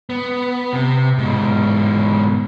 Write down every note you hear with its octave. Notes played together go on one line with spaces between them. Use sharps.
B3
C3
G#2 B2